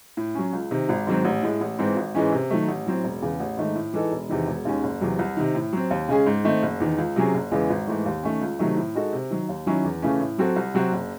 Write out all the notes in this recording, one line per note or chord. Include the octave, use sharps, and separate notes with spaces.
A2
F#3 C#4
C#2
C3 D#3
G#1
G#2 D#3 F#3 C4
A1
A2 G#3
A1
G#2 E3 C4
G#1
G#2 E3 G#3 C#4
C3
D#3 F#3 A3
A1
A2 F#3 C4
E1
E2 C#3
A1
G#2 D#3 A3 D#4
A2
E3 G#3 D#4 A4
E1
E2 C3 D#3
E1
D#2 D#3 G#3 C#4
F#1
E2 C3 F#3
C2
C3 D#3
A2
F#3 C4
D#2
C#3 G#3 C#4 G#4
G#2
D#3 A3 C4 D#4
F#1
E2 D#3
C#2
C3 F#3 C#4 G#4
F#1
E2 C#3 E3 G#3
G#1
G#2 E3 A3
D#2
D#3 A3 C#4
C#2
C3 D#3 F#3 A3
A2
G#3 D#4 F#4 A4
C3
D#3 F#3
D#2
D#3 F#3 C#4 E4
E2
C#3 E3 A3 C#4
A2
F#3 C4 F#4 A4
C2
C3 F#3 C4 F#4
F#1